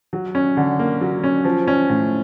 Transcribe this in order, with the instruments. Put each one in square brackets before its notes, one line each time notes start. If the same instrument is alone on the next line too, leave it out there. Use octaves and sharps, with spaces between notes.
[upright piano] F#3
C#4
D3
A#3
F#3
C#4
F3
C#4
A2